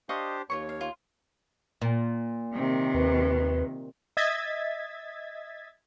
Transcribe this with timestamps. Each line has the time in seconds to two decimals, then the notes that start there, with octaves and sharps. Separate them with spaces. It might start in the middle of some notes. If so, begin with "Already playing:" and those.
0.09 D4 G4 C5 D#5 F5 C#6
0.50 D#2 F4 C5 C#5 C#6
0.69 F5
0.81 F4
1.81 A#2
2.54 C3 D#3
2.94 D#2 B4
4.17 D#5 E5 G#6 A6 B6